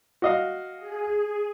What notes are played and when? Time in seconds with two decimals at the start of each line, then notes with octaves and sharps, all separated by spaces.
0.22 F#4 D#5 F5
0.77 G#4